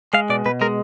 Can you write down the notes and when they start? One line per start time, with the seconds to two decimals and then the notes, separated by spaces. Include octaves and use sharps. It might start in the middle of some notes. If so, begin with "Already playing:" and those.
0.13 G#3 F5
0.29 B2 D5
0.46 B2 B4
0.61 G#3 A#4